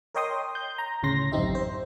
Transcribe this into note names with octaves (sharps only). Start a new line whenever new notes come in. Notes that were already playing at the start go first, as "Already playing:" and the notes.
A#4 C#5 D#5 G5 C6 D#6
G6
A#5
D2 A2 C#3 C#4 C6 A#6
A1 F#2 C4 D#4 G4 E5
C5